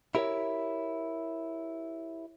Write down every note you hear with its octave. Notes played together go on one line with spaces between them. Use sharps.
E4 G4 A#4 C5 C#5 E5